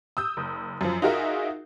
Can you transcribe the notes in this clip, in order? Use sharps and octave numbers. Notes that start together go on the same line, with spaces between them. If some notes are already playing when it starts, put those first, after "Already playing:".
D#6 E6 G6
F#1
F#2 F3
D#4 F4 F#4 G#4 A#4 E5